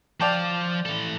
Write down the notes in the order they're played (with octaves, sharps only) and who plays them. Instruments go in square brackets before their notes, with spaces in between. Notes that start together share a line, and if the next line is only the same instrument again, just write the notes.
[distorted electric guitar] F3 F5 [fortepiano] D5 G5 A5
[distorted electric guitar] E3 A4